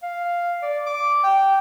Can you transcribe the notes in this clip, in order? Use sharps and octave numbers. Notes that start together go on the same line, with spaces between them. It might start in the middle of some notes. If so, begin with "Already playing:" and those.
F5
D5
D6
G5